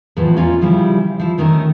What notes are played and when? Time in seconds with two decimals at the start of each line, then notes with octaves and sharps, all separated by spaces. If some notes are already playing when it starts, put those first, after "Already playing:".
0.17 E2 A2 F3 F#4 B4
0.36 A#3 C#4 F4 D5 D#5
0.61 C#3 F3 G3 E4 G4
1.20 F3 E4
1.38 D3 D#3 A3 C#4 D#4 A#4